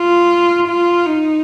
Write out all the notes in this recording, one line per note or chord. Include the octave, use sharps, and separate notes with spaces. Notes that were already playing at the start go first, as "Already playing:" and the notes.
Already playing: F4
F4
D#4